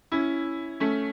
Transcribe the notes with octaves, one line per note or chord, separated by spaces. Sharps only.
C#4 E4
A3 C#4